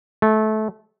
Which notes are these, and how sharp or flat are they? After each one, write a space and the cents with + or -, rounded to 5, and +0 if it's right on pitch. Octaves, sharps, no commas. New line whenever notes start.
A3 -25